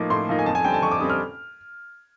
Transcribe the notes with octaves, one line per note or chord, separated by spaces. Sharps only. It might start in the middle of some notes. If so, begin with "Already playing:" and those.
Already playing: A2 F3 A#3 D#4 D6
A2 C6
F3 A#3 D#4
G#5
F2 A5
G#5
D3 G3 C4 G5
A5
F2 C#6
D6
D3 G3 C4 D#6
F6